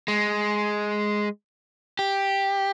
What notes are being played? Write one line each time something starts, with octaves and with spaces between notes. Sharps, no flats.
G#3
G4